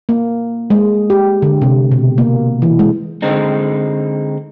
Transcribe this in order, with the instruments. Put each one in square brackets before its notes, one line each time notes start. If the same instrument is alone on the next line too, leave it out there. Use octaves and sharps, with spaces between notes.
[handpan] A#3
G#3
G4
D3
C3
B2
A#3
E3
G#3
[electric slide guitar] D3 G#3 C4 D#4